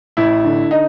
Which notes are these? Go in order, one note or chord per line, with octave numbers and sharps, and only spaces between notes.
A1 E4
D3
D#4